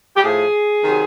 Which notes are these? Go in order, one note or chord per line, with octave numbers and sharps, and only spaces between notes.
G4
A2 F3 G#4
C3 D#3 F#3